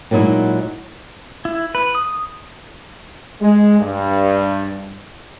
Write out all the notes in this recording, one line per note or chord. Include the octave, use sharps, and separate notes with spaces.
A#2 F#3 G#3 D#4 E4
E4
B4
D#6
G#3
G2